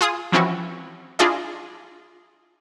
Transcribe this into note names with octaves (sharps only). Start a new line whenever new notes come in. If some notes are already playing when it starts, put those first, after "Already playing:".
F4 G#4 D#6
E3 F3 C4 C#4 E4 F#4
D4 E4 F4 G#4 D5 D#5